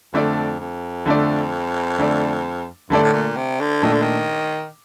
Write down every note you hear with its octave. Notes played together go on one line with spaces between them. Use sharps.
F2 D3 A3 D4 A4 D5
F2
D3 A3 D4 A4 D5
D3 A3 D4 A4 D5
G2 D3 A3 D4 A4 D5
A2
A#2
C3
D3
A#2 D#3 A3 D4 A4
D3
D#3